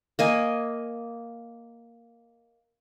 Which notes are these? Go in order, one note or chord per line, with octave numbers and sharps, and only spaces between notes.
A#3 D#5 G#5